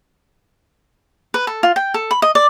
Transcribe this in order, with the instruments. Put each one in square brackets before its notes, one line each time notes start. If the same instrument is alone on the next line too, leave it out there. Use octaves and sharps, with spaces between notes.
[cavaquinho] B4
A4
F4
G5
A4
B5
D#5
D5